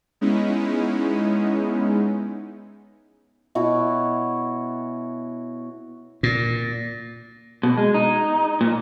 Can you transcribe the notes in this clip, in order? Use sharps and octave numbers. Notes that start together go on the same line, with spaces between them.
G#3 B3 C#4 D#4 E4
B2 E4 F#4 C#5
A#2
B2
G#3
D#4
A#2